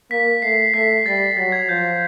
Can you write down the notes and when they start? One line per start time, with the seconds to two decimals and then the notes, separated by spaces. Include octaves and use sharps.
0.11 A#3 B6
0.42 A3 C7
0.74 A3 B6
1.06 G3 A6
1.37 F#3 A6
1.52 G#6
1.69 F3 G6